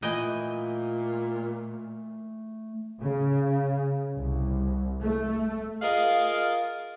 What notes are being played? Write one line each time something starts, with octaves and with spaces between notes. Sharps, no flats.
A#2 E3 A3 D#5 G5
C#3
C2
A3
F4 G#4 A#4 D#5 F5